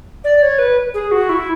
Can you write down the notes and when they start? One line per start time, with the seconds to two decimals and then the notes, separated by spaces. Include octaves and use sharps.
0.24 D5
0.42 C#5
0.59 B4
0.94 G#4
1.11 F#4
1.29 E4